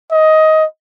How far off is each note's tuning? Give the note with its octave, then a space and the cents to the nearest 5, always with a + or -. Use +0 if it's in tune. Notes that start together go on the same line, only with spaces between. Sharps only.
D#5 +15